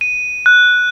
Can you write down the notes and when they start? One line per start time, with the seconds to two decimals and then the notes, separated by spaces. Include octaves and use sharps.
0.01 D#7
0.46 F#6